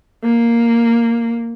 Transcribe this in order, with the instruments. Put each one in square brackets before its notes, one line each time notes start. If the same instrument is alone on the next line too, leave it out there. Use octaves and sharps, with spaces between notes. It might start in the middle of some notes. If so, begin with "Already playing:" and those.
[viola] A#3